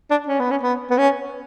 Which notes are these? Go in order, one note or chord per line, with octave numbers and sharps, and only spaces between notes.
D4
C#4
B3
C#4
B3
B3
C#4